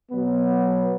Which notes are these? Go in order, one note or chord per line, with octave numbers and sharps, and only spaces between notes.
B2 F#3 B3